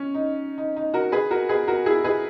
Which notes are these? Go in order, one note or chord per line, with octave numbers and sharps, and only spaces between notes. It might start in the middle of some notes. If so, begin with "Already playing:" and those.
Already playing: C#4
D#4
D#4
D#4
F#4 A#4
G#4 B4
F#4 A#4
G#4 B4
F#4 A#4
E4 G#4
G#4 B4